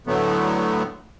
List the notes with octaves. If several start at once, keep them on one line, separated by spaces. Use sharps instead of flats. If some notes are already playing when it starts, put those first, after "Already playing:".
A2 D3 F#3 A3 B3